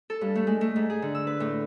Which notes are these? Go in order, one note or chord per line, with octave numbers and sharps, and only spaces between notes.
A4
G2
A3
G#3
A3
G#2
G#4
D3
E6
B4
A2